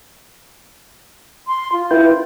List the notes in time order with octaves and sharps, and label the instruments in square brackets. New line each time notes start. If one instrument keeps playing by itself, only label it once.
[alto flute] C6
F4
[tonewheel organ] E4 B4 G5